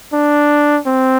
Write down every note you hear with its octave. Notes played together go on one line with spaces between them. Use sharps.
D4
C4